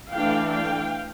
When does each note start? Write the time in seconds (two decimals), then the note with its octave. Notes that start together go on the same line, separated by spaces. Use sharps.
0.11 E3 A3 D4 F5 G5
0.51 F5 G5